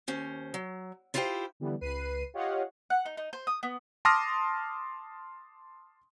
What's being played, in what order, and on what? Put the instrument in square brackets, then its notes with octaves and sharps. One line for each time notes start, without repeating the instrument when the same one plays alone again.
[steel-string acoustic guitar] D#2 C#4 C5
F#3
E4 F4 G4 C5 D5 G5
[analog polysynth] D3 E3 G3 B3
C#2 B4 C7 D#7
F4 G4 C#5 D#5 F5 F#5
[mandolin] F#5
D#4
D#4
C5
D#6
B3
[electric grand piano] A5 C6 D6 D#6 F6 A#6